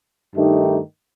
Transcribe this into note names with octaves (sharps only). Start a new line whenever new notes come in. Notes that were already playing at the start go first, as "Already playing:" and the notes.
G2 D#3 A3 D#4 G4